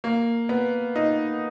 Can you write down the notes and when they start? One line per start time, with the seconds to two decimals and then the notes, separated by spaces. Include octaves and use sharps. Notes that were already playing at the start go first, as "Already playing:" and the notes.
0.04 A#3
0.49 B3
0.96 D#4